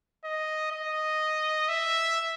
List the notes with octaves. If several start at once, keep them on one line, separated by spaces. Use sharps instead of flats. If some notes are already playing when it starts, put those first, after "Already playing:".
D#5
D#5
E5